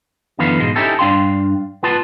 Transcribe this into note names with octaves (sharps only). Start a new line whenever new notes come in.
F#2 D3 E3 B3 B4 F5
G#2 B2 G#3
C#4 D#4 E4 G4 A4
G2 D4 F5 G5 C6
B3 F4 B4 A5